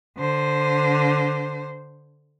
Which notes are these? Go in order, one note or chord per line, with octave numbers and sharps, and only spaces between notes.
D3 C5